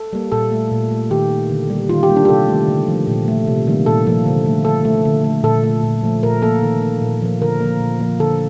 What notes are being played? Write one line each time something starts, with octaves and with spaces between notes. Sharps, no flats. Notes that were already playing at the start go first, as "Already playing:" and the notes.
Already playing: A4
G3 A#3
A#2 A4
A3
A#2
A3
D#3 G4
A#3
D3
G3 A#3
D#3 F4
G4
G3 A#3
D4
G4
C3 A4
D#3 A3
D3
F3 A3
A#2
A3
C3
D#3 G3 A#3
A#2 A4
F3 A#3
D3
A3
D3 A4
A3
D3
A3
A#2 A4
A3
A#2
F3 A3
A#2 A#4
F3 A#3 A4
D#3
A#3
A#2
F3 A#3
D3 A#4
F3 A#3
A#2
F3 A#3
D3 A4